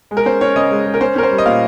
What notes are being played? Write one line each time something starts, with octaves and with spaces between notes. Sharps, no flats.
G#3
A#4
C#4 C5
C#4 C#5
C#3 D#5
G#3
G#3
A#4
C#4 C5
C#4 A#4
C5
G3
D#5
A#2 F5